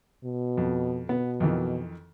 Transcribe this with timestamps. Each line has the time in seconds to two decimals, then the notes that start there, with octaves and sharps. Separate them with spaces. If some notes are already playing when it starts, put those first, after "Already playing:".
0.24 B2
0.57 F2
1.09 B2 B3
1.40 F2 D#3 E3